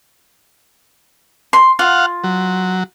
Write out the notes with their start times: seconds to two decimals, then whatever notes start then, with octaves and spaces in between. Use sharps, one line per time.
1.53 C6
1.79 F4 F5 F#5
2.24 F#3